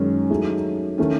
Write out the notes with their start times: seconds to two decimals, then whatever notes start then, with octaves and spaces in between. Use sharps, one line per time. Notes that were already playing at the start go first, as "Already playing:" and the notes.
Already playing: F#2 D#3 G#3 C#4
0.30 F#3 A3 D#4 G#4
0.98 D#3 A3 C#4